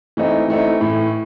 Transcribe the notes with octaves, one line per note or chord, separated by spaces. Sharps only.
E3 A3 C4 D#4
E3 A3 C4 D#4
A2 E3 A3